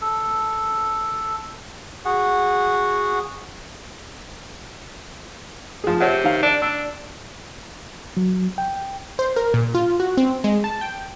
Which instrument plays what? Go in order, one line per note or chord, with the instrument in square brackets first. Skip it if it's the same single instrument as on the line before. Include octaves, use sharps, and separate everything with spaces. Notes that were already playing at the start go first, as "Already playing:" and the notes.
[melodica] A4
F#4 G#4 F#5
[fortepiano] F3 G#4
[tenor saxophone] C3 [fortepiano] C#5 F#5
[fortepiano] D#3 F5
[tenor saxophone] D4
[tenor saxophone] D4 [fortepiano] E6
[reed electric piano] F#3
G5
[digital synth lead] C5
A#4
A#2
F4
F#4
C4
G#3
A5
G5